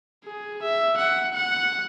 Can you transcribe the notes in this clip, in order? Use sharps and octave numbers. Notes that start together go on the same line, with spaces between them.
G#4
E5
F#5
F#5